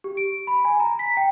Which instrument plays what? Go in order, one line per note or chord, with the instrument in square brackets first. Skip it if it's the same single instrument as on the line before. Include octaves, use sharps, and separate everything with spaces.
[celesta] G4
D7
B5
G#5
A#5
B6
G5